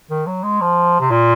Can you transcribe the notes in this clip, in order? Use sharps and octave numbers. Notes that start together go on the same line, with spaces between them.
D#3
F#3
G#3
F3
C3
A#2